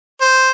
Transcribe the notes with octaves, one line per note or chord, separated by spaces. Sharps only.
C5